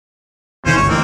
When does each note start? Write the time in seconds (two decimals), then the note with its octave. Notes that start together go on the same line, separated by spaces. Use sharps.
0.66 B2 D#3 E3 C#4 C5
0.77 G1 C#2 C#5
0.89 D2 E3 A#3 C4